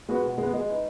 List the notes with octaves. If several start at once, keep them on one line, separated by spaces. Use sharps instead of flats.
G#3 B3 F#4 B4
B2
G#3 B3
G#3 D#5
D#4 B4